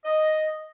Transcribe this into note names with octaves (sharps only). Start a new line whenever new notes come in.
D#5